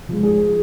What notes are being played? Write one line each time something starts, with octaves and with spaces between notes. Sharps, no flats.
F3 G#3
G#4